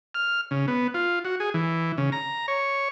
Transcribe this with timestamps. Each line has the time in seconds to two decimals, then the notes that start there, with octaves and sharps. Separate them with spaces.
0.15 F6
0.51 C#3
0.68 B3
0.94 F4
1.25 F#4
1.40 G#4
1.54 E3
1.98 C#3
2.12 A#5
2.48 C#5